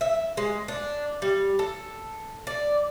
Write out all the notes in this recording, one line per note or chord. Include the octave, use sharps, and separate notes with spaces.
E5
G#3
D4
G3
A4
D5